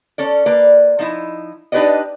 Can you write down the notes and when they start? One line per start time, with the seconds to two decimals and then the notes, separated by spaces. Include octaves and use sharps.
0.18 C#4 A4 D5
0.46 A#3 B4 D5
0.99 F3 D#4 E4
1.72 D4 D#4 G4 B4 D5 D#5